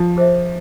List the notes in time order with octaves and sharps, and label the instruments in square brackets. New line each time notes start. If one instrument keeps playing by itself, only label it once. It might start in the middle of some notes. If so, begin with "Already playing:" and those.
Already playing: [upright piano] F3
[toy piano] G#4 C5 E5